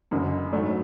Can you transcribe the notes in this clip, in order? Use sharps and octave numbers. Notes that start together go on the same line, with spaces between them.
F#1 F#2 D3
G#2 F#3 A3 D4